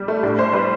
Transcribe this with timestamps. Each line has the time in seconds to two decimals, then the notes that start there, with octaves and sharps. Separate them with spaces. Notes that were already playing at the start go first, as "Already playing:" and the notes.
Already playing: G3
0.08 A3
0.23 A2 D4
0.39 C5
0.53 G3 B4